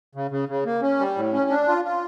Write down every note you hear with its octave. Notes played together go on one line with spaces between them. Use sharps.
C#3
C#3
C#3
A#3
C#4
G3
A2
C#4
D4
F4
F4